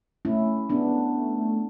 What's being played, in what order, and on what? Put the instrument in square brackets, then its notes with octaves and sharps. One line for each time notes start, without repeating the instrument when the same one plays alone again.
[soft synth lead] A3 [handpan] C#4 E4
[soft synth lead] G#3 [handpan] B3 D4
[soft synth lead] A3
A3
A3